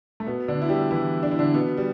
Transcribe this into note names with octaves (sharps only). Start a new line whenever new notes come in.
A3
B2 B3
D3 D4
E4
G3 G4
E3 E4
D4
E4
D3 D4
B2 B3
G3